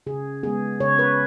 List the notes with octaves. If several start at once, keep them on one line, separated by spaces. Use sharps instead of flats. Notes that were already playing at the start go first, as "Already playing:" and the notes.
C#3 G#4
G#3 B3 G#4
C#3 C#5
B4